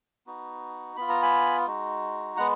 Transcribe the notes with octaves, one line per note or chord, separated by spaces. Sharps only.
B3 D#4 F#4
B3 F4 B5
A#5
G#5 B5
G#3 D#4 F#4
G#3 B3 F#5 A#5